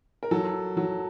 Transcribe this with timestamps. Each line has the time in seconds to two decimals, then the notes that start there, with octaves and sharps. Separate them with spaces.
0.23 A#4
0.31 F#3 A4
0.77 F#3